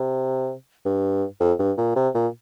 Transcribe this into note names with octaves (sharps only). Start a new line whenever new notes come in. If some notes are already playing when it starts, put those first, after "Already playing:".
Already playing: C3
G2
F2
G2
A#2
C3
A#2